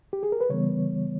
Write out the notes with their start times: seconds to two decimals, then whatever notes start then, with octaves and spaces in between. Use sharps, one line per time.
0.13 G4
0.23 G#4
0.32 A#4
0.40 B4
0.49 C#3 E3 G3 B3 C#5